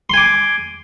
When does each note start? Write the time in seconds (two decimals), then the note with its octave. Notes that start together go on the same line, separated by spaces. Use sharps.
0.10 C6
0.14 G#5
0.17 D6